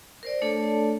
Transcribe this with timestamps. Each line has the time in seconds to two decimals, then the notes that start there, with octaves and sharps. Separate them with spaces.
0.23 A#4 C5 D5
0.42 A3 D4 A4 C#5 D5 A5